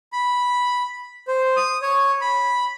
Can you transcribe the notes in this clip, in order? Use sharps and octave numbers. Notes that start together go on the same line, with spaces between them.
B5
C5
D#6
C#5
B5